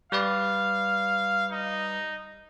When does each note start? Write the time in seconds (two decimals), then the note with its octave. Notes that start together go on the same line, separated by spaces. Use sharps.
0.12 G3 B4 D5 F5
1.52 D#4